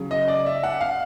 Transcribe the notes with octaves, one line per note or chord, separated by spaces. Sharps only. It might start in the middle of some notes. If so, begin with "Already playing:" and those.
Already playing: C#3 F#3
D#5
D5
E5
F#5
F5